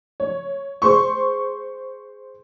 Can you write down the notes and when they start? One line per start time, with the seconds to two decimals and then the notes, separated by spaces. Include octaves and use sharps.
0.20 C#5
0.82 G#4 C5 C6 C#6